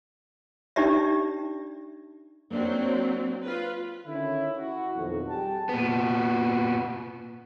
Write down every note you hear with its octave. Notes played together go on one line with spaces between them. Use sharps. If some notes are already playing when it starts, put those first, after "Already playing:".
D4 D#4 G4 D5 E5
F#3 A#3 C4 D4 D#4
F4 B4
D3 D#3 C#4 E4
E4 F#4
B1 F2 D#3 F#4
G3 G#4 G5 A5
A#2 B3